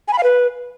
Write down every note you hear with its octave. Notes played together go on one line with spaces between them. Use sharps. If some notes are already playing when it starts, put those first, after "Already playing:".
G#5
B5
F5
B4